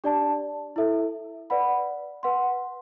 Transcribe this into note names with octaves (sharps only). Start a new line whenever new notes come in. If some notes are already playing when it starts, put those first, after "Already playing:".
D4 G4 D5 A5
E4 A4 E5
B4 D5 F#5 B5
B4 F#5 C6